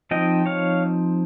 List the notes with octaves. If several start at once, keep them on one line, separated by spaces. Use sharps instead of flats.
F3 C4 D#4 D#5 G5
C#5 F5